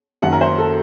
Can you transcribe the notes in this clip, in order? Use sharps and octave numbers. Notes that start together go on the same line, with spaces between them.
F#1 F#2 D#3 F#3 F#5
A#4
C5
A4